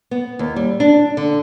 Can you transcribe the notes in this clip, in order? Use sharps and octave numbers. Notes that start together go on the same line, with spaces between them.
B3
D#2
G3
D4
D3